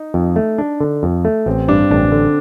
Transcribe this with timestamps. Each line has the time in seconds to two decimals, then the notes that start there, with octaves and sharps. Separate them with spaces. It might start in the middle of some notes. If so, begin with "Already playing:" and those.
Already playing: D#4
0.14 F2
0.36 A3
0.58 D4
0.80 D3
1.03 F2
1.25 A3
1.46 A1 C4
1.68 G2 D4
1.91 A1 D4
2.12 D3